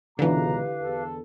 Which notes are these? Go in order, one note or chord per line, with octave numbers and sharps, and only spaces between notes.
C#2 B2 D3 E3 G4 B4 F5 A#5
E2 A4